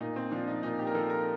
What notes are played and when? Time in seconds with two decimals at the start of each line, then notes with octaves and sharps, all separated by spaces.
0.01 A#2 D#4
0.16 C4
0.31 F3 D4
0.48 D#4
0.63 A#2 D#4
0.79 G4
0.87 A#4
0.94 F3 A4
1.10 A#4